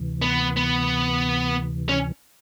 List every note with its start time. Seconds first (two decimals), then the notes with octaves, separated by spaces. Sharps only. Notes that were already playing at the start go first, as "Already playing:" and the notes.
Already playing: D2 C3 E3
0.22 B3
0.57 B3
1.89 C#4